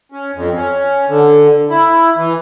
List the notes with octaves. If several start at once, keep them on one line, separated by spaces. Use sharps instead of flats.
C#4
F2
C#4
D3
E4
E3